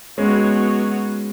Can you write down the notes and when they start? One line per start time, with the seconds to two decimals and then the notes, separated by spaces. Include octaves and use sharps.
0.18 F#3 G#3 B3 C#4 F#4 C#5